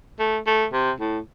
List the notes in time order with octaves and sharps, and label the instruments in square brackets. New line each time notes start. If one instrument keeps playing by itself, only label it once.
[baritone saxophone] A3
A3
C3
A2